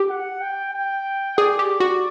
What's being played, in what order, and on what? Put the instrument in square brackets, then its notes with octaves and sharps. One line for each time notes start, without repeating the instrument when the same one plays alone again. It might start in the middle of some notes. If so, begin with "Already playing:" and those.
Already playing: [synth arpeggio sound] G4
[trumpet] F#5
G5
G5
[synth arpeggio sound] G#4 [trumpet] D5
[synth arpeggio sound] G4
F#4